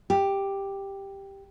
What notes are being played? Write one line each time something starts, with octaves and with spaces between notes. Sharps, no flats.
G4